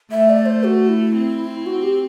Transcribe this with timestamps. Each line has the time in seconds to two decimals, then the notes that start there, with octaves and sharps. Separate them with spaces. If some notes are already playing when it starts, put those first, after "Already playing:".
0.11 A3 E5
0.30 D5
0.46 C5
0.64 F#4
0.89 E4
1.15 C4
1.66 F#4
1.83 G4